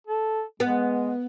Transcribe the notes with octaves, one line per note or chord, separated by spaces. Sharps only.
A4
G#3 B3